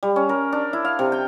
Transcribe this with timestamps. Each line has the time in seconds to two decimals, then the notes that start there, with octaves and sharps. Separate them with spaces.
0.03 G3
0.16 C#4
0.29 A#4
0.52 D4
0.73 E4
0.85 F5
0.99 C3
1.12 G5